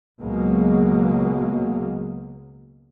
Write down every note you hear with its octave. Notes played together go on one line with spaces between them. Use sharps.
C#2 B2 F#3 G#3 A#3